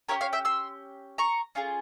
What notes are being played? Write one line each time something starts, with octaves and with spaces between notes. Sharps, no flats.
C#4 E4 G4 A#4 C#5
C#5 F5
E5 G5
C6 E6
A#5 C#6
C#4 F4 G#4